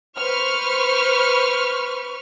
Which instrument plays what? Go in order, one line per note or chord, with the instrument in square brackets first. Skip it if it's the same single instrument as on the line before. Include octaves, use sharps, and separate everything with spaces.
[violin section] B4 C5 C#6 F6